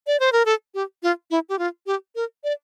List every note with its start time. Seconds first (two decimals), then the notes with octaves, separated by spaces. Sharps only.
0.07 D5
0.20 C5
0.32 A#4
0.46 A4
0.74 G4
1.03 F4
1.31 E4
1.49 G4
1.59 F4
1.87 G4
2.16 A#4
2.44 D5